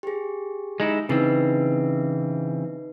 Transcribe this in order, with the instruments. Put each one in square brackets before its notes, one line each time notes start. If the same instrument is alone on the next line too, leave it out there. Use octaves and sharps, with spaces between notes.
[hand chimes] G4 G#4
[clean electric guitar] G#3 D#4 E4
[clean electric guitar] C#3 E3 C4 [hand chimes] D#4 B4 C7